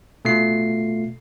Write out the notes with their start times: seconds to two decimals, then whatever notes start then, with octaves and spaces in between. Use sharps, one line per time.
0.25 B2 A3 F4 C7